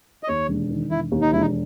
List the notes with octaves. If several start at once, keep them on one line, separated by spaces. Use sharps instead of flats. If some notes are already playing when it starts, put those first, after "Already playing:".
D#5
D#2 C#5
E1
D#3
E1 E4
D#2
D#4
E1 E4
D#4